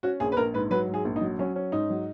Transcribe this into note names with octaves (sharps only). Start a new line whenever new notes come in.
C#4 F#4
A#1 G#4
B4
A#1 A#4
G#2 B4
F#3 B4
G#2
G#4
A#1
D#4
F#3
F#3 C#4
C#4
G#2 D#4
F#3